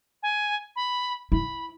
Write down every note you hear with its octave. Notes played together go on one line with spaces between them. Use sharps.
G#5
B5
E4 B5